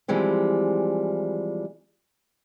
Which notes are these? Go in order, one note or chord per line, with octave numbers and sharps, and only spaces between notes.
E3 F3 G3 G#3 C4